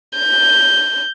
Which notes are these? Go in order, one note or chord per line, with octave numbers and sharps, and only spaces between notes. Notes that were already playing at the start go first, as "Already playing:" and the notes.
G6